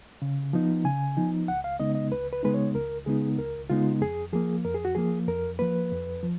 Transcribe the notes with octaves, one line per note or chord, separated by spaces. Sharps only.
C#3
F3 B3 D#4
C#3 G#5
F3 B3 D#4
C#2 F#5
F5
C#3 G#3 B3 D#4 D#5
D#5
C#2 B4
B4
C#3 G#3 B3 D#4 B4
C#5
C#2 A#4
C#3 G#3 B3 D#4 G#4
C#2 A#4
C#3 G#3 B3 D#4 F4
F2 G#4
F3 A#3 G#4
F2 A#4
G#4
F#4
F3 A#3 G#4
F2 A#4
F3 A#3 B4
F2
F3